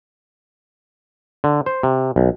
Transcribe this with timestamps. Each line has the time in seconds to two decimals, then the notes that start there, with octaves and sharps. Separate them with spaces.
1.44 D3
1.66 C5
1.83 C3
2.16 B1